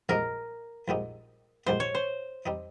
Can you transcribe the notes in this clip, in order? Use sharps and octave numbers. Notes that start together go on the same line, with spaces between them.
A#1 G#2 G3 C4 D#4 A#4
A#1 G#2 G3 C4 D#4
A#1 G#2 G3 C4 D#4 C5
C#5
C5
G3 C4 D#4